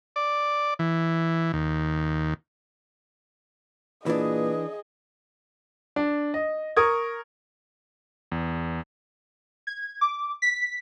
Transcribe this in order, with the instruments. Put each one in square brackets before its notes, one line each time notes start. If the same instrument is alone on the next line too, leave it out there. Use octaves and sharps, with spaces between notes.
[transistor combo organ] D5
E3
D#2
[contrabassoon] A#2 [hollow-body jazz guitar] E3 D4 [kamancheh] G#4 D#5 [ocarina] B4
[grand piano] D4
D#5
A#4 C#6 D#6 G#6
[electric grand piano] E2
[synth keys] G#6
D6
B6